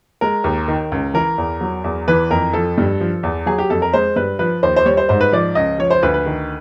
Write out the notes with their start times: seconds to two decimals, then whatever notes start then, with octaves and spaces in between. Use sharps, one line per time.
0.21 G#3 A#4
0.44 D#2
0.68 D#3
0.92 C#2
1.14 E3 A#4
1.38 E2
1.61 F#3
1.84 E2
2.08 E3 B4
2.31 F2 A#4
2.53 F3 A4
2.78 G2
3.01 F3
3.23 E2
3.46 F#3 G#4
3.58 G4
3.70 F2 A4
3.82 A#4
3.93 G#3 C5
4.16 G2 B4
4.39 F3 B4
4.63 D#2 C5
4.76 C5
4.86 G3 C#5
4.97 C5
5.09 G#2 C5
5.21 B4
5.32 F3 D5
5.55 C#2 D#5
5.79 F3 C#5
5.90 C5
6.03 D2 B4
6.14 B4
6.26 D#3